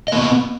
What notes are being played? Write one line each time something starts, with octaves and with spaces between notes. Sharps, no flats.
A#3 B3 D#5